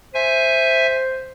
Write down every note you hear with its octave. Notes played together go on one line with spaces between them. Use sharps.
C5 E5 G#5